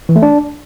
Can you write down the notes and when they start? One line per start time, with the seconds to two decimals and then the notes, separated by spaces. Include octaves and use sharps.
0.09 E3
0.16 A3
0.22 D4